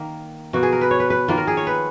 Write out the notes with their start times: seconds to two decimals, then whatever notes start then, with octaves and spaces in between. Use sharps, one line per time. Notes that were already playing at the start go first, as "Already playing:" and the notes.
Already playing: D#3 A#3
0.53 B2 A#3 F#4
0.63 G#4
0.73 A#4
0.81 B4
0.91 C#5
1.00 B4
1.10 B4
1.28 D#3 A#3 F4
1.38 A#4
1.47 G#4
1.57 C#5
1.67 B4